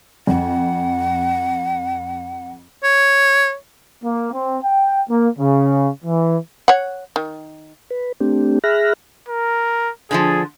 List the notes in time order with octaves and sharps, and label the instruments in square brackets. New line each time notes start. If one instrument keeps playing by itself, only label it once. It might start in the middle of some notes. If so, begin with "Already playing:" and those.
[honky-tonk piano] F2 [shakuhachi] F#5
[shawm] C#5
[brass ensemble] A#3
C4
G5
A#3
C#3
E3
[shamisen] C#5 F#5
D#3
[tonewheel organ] B4
A3 C4 D4 G4
G#4 E5 B5 F6 F#6 A#6
[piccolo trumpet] A#4
[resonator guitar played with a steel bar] D3 E3 F3 [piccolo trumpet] G#4